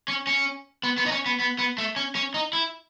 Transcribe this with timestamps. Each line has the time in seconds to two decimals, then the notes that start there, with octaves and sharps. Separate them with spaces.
0.08 C#4
0.27 C#4
0.83 B3
0.98 B3
1.06 D#4
1.12 C#4
1.26 B3
1.40 B3
1.59 B3
1.78 A3
1.96 C#4
2.15 C#4
2.34 D#4
2.53 E4